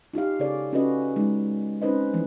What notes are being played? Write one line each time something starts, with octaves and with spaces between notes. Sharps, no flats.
D#4 F4 G4 F5
C#3 G#4 A4 C#5 D5
C#4 F4 F#4 A4 B4 D#5
G#3 D#4
C4 C#4 D#4 B4 C5 D#5
E3 F3 A3